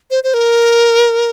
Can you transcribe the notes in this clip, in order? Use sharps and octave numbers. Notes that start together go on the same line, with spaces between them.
C5
C5
A#4